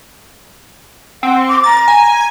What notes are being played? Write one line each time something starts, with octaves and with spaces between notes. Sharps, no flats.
C4 F#5
D6
A#5 A6
G#5